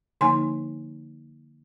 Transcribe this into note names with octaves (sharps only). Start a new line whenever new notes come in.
D3 F3 A#3 D#4 G#5 C6